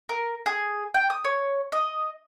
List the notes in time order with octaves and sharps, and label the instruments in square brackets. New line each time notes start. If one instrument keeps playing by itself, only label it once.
[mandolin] A#4
G#4
G5
D#6
C#5
D#5